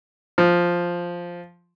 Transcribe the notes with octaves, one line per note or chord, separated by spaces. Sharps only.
F3